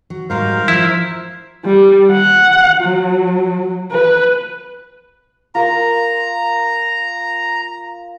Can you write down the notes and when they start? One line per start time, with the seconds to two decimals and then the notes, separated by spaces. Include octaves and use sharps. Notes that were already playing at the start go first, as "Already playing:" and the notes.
0.10 F#3
0.30 G#2 F#3 G3 A#4 C5 F5
0.68 F3 E4
1.65 G3
2.12 F#5
2.81 F#3
3.91 B4
5.55 F4 A#4 F5 A#5